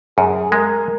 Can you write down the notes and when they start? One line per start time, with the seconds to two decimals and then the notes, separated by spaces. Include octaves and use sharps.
0.18 F#2 G#4
0.51 G#3 A#4